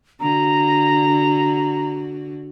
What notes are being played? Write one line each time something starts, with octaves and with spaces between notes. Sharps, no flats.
D3 F#4 A#5